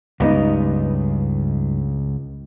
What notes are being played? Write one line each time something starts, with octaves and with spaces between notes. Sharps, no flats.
C#2 G2 B3 D#4